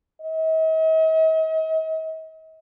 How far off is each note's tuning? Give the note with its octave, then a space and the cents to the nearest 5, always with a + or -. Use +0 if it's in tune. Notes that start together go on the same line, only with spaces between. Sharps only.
D#5 +45